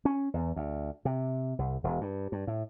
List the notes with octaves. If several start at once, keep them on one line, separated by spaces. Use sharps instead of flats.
C#4
E2
D2
C3
C2
E1
G2
G2
A2